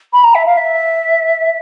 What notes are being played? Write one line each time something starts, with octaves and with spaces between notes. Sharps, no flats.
B5
A#5
E5
F5
E5